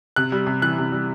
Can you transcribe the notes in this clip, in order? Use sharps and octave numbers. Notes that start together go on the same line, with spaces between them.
C3 F#6
G3
C3
E3 F#6
C3
G3